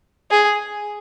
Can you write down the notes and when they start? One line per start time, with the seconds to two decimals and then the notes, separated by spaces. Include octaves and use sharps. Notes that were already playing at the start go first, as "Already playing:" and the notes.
0.30 G#4